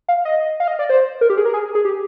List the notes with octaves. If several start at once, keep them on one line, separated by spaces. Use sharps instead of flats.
F5
D#5
F5
D#5
D5
C5
A#4
G4
G#4
A#4
G#4
G#4
G4